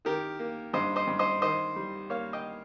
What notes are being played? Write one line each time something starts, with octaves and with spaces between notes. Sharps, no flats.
D#3 G4 A#4
A#3
G2 C5 D#5
C5 D#5
G2
C5 D#5
D#3 C5 D#5
G3
A#3 C#5 F5
D#5 G5